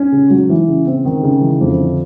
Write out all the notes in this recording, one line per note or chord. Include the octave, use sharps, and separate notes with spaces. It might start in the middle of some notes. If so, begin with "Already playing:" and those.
Already playing: C#4
C#3
F#3
E3
C#3
C4
D#3
C#3
E3
F2
D3